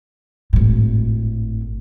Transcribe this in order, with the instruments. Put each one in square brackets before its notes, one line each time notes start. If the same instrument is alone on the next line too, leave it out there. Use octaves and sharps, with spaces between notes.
[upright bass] G#1 A2